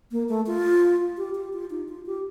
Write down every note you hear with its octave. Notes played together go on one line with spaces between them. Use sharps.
A#3
A3
F4
G4
G4
F4
D#4
F4
G4